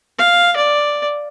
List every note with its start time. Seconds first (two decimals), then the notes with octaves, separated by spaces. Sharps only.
0.18 F5
0.56 D5